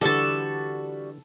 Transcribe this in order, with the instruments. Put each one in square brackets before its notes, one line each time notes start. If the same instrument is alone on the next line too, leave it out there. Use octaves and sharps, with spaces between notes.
[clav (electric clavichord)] D3 E3 [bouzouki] G3 F#4 E5 [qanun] A4 A5